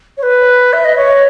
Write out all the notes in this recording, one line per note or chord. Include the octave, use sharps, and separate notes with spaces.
C#5
B4
E5
D#5
C#5